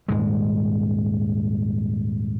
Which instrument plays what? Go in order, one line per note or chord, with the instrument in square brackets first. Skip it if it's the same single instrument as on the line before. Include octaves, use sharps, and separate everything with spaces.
[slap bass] D#1 G#2 G#3